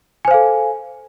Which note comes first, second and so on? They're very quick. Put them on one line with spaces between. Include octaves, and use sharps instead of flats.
G#5 C5 F5 A4